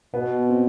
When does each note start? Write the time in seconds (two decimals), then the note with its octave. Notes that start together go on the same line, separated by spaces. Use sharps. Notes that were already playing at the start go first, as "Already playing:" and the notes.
0.14 B2 B3
0.49 C4